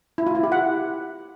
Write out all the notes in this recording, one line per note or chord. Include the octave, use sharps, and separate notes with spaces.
E4
F4
E4
G4
F#5